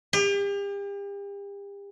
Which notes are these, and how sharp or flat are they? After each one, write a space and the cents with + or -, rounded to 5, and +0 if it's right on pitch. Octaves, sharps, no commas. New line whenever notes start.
G4 +40